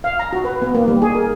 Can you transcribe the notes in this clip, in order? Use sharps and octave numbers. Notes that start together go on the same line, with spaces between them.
F5
A#5
F#4
B4
B3
A#3
G3
G#4
A#4